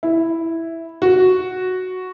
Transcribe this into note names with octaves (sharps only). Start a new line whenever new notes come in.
E4
F#4